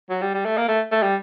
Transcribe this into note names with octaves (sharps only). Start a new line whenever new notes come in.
F#3
G3
G3
A3
A#3
A3
A3
G3